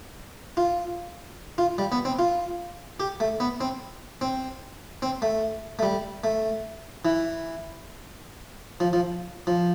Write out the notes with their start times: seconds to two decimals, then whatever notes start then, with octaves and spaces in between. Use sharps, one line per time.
0.57 F4
1.58 F4
1.78 G3
1.92 B3
2.05 C4
2.19 F4
3.00 G4
3.20 A3
3.40 B3
3.61 C4
4.21 C4
5.02 C4
5.22 A3
5.79 A3
5.83 G3
6.24 A3
7.05 E3
8.80 F3
8.93 F3
9.47 F3